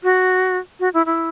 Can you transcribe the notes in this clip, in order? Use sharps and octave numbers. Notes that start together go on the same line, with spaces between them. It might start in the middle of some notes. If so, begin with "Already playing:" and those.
F#4
F#4
E4
E4